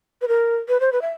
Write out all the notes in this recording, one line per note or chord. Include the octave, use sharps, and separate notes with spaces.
B4
A#4
B4
C5
B4
E5